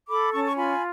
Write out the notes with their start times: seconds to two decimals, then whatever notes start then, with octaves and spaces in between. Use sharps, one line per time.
0.08 A4 B5 D6
0.32 C#4 A5 C#6
0.44 C#6
0.57 F4 G#5 B5